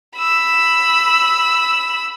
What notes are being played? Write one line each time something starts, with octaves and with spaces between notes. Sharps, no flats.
B5 E6